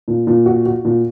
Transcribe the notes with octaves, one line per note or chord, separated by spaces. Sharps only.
A#2
A#2
F#4
F#4
A#2